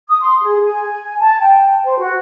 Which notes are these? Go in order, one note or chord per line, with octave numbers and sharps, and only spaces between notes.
D#6
C6
G#4
G#5
A5
G5
C5
F#4